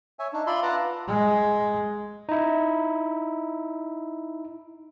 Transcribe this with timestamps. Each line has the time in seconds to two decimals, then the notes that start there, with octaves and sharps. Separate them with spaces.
0.19 C#5 E5 G#5
0.33 D4 D#4
0.47 F4 D5 E5 B5 C6
0.62 F4 B4 F#5 A5 A#5 D6
1.08 G#3
2.29 D#4 E4